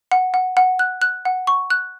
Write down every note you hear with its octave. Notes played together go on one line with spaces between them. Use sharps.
F#5
F#5
F#5
F#6
F#6
F#5
C#6
F#6